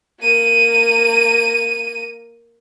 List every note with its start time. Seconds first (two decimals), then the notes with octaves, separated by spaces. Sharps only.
0.20 A#3 D#7